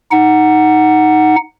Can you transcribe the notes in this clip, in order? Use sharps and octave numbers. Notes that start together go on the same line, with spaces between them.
D#4 F#5